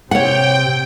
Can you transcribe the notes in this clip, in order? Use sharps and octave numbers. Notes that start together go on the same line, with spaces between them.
C3 C#5 F#5 G5